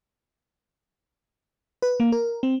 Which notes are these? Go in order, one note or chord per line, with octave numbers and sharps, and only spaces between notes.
B4
A#3
A#4
C4